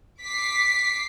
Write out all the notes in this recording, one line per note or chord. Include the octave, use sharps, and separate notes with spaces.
D6 B6 C7